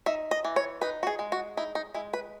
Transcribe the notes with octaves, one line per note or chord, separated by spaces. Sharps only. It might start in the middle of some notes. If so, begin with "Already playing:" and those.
D#4 E5
D#5
E3
C#5
D#4 B4
F#4
G#4
G#3
F#4
D#4 E4
D#4
G#3 E4
B4